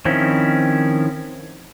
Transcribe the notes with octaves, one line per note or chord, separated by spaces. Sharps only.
D#3 F3 C4 C#4 E4